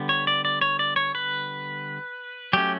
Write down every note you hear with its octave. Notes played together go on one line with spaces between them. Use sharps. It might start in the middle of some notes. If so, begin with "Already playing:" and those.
Already playing: D3 G3 B3
C#5
D5
D5
C#5
D5
C#5
B4
F#3 A3 C#4 G4